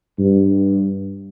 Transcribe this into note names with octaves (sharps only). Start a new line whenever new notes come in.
G2